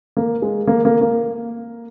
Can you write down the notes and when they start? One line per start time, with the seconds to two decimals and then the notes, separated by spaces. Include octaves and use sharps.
0.17 A#3
0.42 G#3
0.67 A#3
0.85 A#3
1.01 A#3